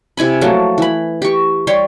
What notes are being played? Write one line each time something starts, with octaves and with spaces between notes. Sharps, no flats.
C3 E4 G#5 B5
F3 F#3 A3 A#3
E3 B5
G4 C#6
G3 G4 C#5 C6